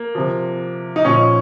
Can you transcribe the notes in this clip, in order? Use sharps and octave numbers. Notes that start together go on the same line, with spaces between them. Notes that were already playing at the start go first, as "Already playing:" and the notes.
Already playing: A#3
C3 F3
D#4
A#2 F3 C#4